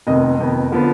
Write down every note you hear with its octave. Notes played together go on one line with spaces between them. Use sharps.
F1 F2 D#3 B3 D#5
F1 F2 D#3 B3
D3 F3 B3